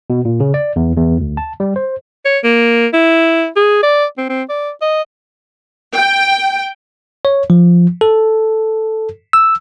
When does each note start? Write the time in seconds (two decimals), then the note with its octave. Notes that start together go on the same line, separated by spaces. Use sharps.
0.10 B2
0.25 A#2
0.40 C#3
0.54 D5
0.76 E2
0.97 E2
1.20 D2
1.37 A5
1.60 G3
1.76 C5
2.25 C#5
2.44 A#3
2.93 E4
3.56 G#4
3.83 D5
4.18 C4
4.29 C4
4.49 D5
4.81 D#5
5.95 G5
7.25 C#5
7.50 F3
8.01 A4
9.33 E6